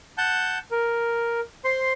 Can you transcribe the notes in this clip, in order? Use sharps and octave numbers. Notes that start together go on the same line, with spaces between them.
F#5 A5 G6
A#4
C5 C6